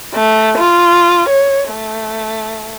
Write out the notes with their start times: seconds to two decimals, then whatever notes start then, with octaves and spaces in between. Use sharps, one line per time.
0.15 A3
0.59 F4
1.28 C#5
1.71 A3